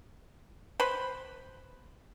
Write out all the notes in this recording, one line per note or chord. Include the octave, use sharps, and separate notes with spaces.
B4 C5 B5